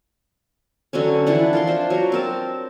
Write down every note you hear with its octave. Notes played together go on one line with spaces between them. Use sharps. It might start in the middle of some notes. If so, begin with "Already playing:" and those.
D3 F#3 C4 C#4
E3 F3 D4 F#5
F4 A#4 C6
D4 C5
F#3 A#5
C4 A#4 A5